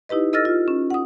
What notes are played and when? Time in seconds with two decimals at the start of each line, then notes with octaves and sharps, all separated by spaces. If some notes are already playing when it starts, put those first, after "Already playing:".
0.09 D#4 E4 G4 B4 D#5
0.33 A4 D#5 E6 F6 A6 A#6
0.45 F4
0.68 C#4
0.90 F#5 D#6